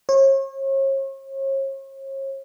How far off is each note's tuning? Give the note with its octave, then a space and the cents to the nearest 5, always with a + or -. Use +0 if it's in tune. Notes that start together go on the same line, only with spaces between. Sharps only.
C#5 -40